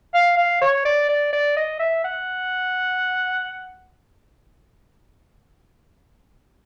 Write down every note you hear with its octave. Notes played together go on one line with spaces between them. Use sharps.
F5
F5
C#5
D5
D5
D5
D#5
E5
F#5